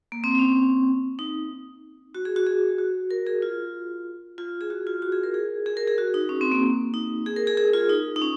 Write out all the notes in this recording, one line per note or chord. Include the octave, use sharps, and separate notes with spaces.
A#3
C4
C#4
D#4
F#4
G#4
F#4
G#4
F#4
A#4
G#4
F4
F4
G#4
F#4
F4
F#4
G#4
A#4
G#4
G#4
A#4
G#4
F#4
D#4
C#4
C4
A#3
D#4
G#4
A#4
G#4
G#4
F4
D#4
D#4
C#4